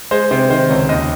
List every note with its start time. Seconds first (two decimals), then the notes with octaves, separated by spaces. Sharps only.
0.11 G#3 C5
0.31 C3 C5
0.50 D#3 C5
0.70 C#2 C#5
0.89 D#2 D#5